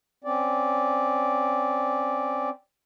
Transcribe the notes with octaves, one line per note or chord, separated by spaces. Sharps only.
C4 C#4 D5